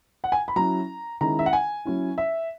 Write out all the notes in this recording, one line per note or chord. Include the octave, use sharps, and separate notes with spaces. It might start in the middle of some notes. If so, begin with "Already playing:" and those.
F#5
G#5
B5
F#3 C#4 E4 A#5
D#3 G#3 C#4 E4 A#5
E5
F#5
G#5
F#3 C#4 E4
E5